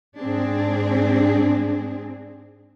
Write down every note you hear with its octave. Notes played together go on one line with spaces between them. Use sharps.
G#2 C4 D4 G#4